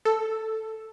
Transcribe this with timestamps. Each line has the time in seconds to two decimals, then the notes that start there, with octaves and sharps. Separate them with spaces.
0.05 A4